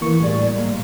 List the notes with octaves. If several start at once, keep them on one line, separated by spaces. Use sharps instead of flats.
E3 A#3 C#6
A2 G3 G#4 D5
G#3 A#3